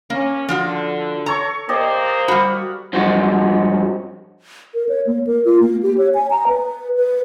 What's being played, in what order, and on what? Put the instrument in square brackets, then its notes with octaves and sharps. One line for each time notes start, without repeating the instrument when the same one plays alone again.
[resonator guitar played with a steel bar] A#3 [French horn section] C#4
[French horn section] D3 [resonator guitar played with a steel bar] F3 F4 F#4
[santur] A4 C#5 C#6 [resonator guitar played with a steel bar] A#5
[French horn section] A#3 C5 [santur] G4 D5 D#5
[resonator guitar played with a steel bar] G3 F#4 [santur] F5 B5
[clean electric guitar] G2 F3 F#3 G#3 C4 F#4
[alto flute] A#4
C#5
A#3
A#4
F4
A#3
G4
C#5
G#5
A#5
B4
B4